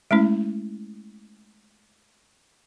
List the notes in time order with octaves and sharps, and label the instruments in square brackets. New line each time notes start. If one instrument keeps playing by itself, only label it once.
[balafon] G#3 A3 C#4 E4